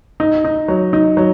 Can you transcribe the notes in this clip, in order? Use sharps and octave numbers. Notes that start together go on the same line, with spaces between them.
D#4
D#4
F#3
D#4
F#3